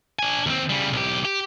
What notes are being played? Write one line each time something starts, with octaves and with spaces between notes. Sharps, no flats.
D4 G#5
D#2 C4
C#3 G3
B1 G4
G4